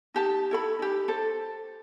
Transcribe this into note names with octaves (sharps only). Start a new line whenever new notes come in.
D#4 G4 A5
E4 A4 B5
D#4 G4
A4 C5